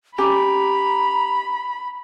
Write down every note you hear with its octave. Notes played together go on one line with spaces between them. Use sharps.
C#4 G4 A#5 B5